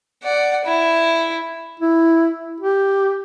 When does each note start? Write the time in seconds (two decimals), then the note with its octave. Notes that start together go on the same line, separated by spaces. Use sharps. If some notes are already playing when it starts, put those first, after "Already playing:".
0.23 D5 F#5
0.64 E4
1.80 E4
2.60 G4